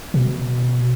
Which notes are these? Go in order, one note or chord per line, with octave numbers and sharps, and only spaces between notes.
B2